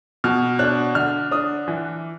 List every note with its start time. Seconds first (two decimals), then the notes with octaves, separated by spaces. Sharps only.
0.24 B2 F6
0.59 D4 F#6
0.95 D3 F6
1.31 D4 D#6
1.68 E3